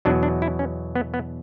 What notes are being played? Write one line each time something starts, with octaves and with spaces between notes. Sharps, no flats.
E2 B2 F#3 D4
D4
E4
C#4
B3
B3